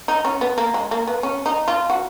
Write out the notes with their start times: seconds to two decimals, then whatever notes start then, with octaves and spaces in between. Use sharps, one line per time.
0.08 D#4
0.25 C#4
0.41 B3
0.58 A#3
0.74 G#3
0.91 A#3
1.07 B3
1.23 C#4
1.46 D#4
1.68 F4
1.90 F#4